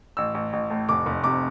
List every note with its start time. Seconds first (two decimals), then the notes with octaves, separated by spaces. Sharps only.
0.17 A1 E6
0.34 A1
0.53 A1
0.70 A2
0.89 F1 D6
1.06 F1
1.24 C3 D6